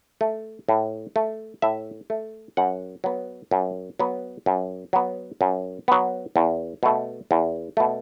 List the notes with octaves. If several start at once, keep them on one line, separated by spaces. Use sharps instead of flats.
A3
A2
A3
A2 E5
A3
F#2 F#5
F#3 B3
F#2
F#3 B3
F#2
F#3 B3
F#2
F#3 B3
E2
B2 A3
E2
B2 A3